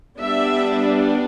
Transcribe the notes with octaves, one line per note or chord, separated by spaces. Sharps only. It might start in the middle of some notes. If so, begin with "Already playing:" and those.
G3 B3 D4 E5